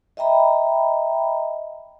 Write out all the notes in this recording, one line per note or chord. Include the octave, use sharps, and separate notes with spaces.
D#5 E5 G5 A#5 B5